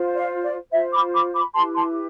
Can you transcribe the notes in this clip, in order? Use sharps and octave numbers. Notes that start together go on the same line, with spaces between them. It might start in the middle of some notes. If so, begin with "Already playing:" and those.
Already playing: F4 C5
D5 F5
D5
F4 C5 E5
B5 D6
B5 D6
B5 D6
E4 G4 B4 A5 C6
A5 C6